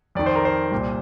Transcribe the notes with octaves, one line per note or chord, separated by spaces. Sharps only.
F2 D#3 D5
C5
A#4
C5
C2 A#2